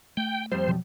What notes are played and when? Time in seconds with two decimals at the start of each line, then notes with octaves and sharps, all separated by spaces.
0.17 A3 G5
0.52 F2 G3 C5
0.68 B2 F3 F#3